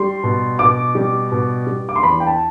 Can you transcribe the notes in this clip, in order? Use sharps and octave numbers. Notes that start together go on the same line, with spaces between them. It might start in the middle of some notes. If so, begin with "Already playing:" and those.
Already playing: G3 C6
B2
B2 D6
G3
B2
G3
D6
C6
E2 B5
G5
A5